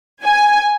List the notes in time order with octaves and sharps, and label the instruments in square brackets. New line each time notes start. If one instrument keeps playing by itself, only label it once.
[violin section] G#5